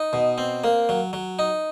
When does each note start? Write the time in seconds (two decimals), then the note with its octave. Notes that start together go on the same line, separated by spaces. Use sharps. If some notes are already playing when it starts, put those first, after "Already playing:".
Already playing: D#4
0.13 B2
0.38 C4
0.64 A#3
0.89 F#3
1.13 F#3
1.39 D#4